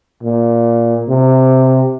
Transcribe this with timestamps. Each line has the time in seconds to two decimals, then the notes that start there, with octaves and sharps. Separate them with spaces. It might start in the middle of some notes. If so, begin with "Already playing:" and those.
0.23 A#2
1.09 C3